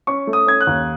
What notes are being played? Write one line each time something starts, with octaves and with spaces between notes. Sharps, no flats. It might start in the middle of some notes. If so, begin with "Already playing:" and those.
C#4 C#6
A3
D#6
C#4 G#6
F#6
D#2